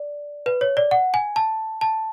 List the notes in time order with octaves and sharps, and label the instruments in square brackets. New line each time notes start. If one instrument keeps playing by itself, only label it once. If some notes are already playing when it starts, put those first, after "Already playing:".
Already playing: [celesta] D5
B4
C#5
D5
F#5
G#5
A5
A5